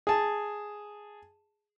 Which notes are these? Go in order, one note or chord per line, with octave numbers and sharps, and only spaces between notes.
G#4 A5